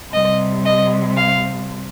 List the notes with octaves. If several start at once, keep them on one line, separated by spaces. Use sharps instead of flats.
C3 G3 D#5
D#5
F5